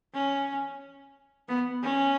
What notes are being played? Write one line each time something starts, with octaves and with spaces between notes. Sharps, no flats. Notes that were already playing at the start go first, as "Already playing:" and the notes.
C#4
B3
C#4